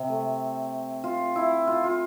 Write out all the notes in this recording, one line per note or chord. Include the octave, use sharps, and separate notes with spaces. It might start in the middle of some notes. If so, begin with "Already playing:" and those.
Already playing: C3
A3
F4
E4
F4
F4